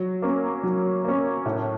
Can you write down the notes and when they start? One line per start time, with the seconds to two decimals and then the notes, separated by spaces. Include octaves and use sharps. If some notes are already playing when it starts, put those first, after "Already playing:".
Already playing: F#3
0.22 A#3 C#4
0.63 F#3
1.04 A#3 C#4
1.46 A2